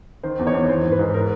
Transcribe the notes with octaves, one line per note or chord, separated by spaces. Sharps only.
D#3 C5
E2
C#5
E2
E3 C5
G#2
B4
G#2
A#4